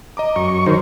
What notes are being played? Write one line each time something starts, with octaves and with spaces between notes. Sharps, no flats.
D#5 A#5 D6
F#2 C#6
D#3 F#3 D#4 A#4 C5